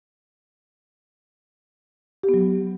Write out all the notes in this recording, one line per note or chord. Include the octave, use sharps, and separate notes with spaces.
G4
B3
F#3